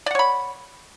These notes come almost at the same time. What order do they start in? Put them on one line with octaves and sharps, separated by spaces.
D5 F#5 C#5 B5